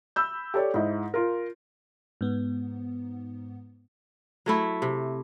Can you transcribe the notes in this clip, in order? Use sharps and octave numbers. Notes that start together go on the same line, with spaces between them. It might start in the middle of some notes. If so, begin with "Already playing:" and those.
B5 E6 G6
G4 A4 C#5 D5
G#2 E4 D#5
F4 A#4
G#2 B3
F#3 A3 E4
C3